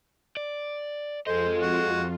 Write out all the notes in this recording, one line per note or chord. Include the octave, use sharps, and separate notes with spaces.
D5
F2 F4 G#4 A4 C5 D#5
F#4